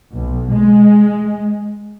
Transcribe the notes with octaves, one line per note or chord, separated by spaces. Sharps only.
B1
G#3